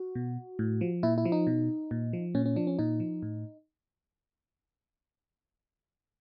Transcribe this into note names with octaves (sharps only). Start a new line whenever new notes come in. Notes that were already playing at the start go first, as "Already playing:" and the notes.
Already playing: F#4
B2
A2
F3
A#2 E4
E4
F3
D#4
B2
A#2
F3
A#2 C#4
C#4
F3 D4
C#4
A#2 D#4
F3
A2